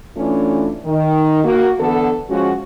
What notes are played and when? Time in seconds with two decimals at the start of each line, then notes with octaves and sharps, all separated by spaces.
0.17 E3 A3 C#4 D4 E4 F4
0.85 D#3
1.44 A#3 F#4
1.80 D3 E3 B3 A4
2.30 F3 G#3 C#4 F#4